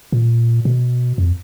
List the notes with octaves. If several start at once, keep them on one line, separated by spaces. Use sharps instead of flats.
A#2
B2
F2